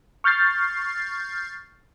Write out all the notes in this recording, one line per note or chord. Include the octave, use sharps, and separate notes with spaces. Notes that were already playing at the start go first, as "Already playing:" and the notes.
C#6 F6 G6 A6 C7